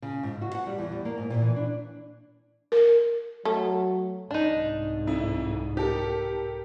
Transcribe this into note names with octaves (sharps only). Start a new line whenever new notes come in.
C#3
G#2
F#4
F#5
G3
E2
G3
A#3
G#2
A#2
E3
D4
A#4
F#3 A3
C2 G#2 D4 D#4
F2 E4
G4 A4 A#4